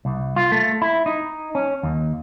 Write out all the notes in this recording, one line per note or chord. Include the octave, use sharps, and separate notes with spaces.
C2
F4
A3
E4
D#4
C#4
D#2